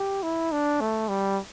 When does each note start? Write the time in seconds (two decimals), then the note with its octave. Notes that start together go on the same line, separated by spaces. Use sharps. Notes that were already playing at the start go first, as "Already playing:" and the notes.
Already playing: G4
0.23 E4
0.52 D4
0.81 A3
1.09 G3